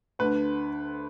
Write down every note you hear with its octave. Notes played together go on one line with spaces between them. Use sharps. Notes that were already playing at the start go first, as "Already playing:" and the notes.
D2 D3 B4